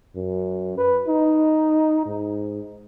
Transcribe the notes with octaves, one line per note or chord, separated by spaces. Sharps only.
F#2
B4
D#4
G#2